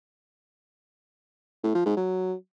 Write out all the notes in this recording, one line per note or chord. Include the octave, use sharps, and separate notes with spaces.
A2
F3
G#2
F#3